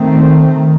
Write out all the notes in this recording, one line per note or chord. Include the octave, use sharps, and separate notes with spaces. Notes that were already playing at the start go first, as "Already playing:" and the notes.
Already playing: D#3 A3 C4
D#3